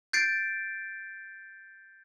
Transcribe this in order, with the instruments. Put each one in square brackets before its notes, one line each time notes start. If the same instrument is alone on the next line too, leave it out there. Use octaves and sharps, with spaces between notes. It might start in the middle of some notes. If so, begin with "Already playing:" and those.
[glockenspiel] G6 A6 C7 D7